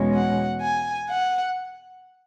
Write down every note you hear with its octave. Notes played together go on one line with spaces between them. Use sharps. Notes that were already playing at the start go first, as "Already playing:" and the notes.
Already playing: E2 B2 G#3 C#4
F#5
G#5
F#5